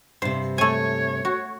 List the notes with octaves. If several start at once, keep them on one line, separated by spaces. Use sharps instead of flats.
G2 C3 C5
A3 C#5 G#5
F#4